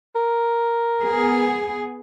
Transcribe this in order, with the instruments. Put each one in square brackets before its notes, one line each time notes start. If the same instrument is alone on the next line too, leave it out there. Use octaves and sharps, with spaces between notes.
[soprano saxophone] A#4
[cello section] B3 G#4